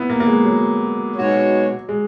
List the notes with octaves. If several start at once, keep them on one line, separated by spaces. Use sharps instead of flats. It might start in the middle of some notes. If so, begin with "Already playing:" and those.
Already playing: B3 E4
A#3
A#3
G#3
F#3
B2 G#3 D#4 F#4 C#5
G#3